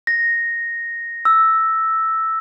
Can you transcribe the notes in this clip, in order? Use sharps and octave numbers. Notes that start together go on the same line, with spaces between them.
A#6
E6